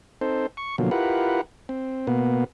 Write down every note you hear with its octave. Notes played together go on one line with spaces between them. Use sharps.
C4 D#4 A4 C5
C#6
B2 D3 F3 F#3 A#3
E4 F4 G4 A#4 B4 F#5
C4
B2 A#3 B3